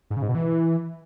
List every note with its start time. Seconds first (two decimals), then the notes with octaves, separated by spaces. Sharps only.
0.10 G#2
0.16 C#3
0.23 G#2
0.29 B2
0.35 E3